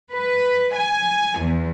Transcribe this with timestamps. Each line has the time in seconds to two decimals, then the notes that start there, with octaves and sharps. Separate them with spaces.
0.12 B4
0.76 G#5
1.40 E2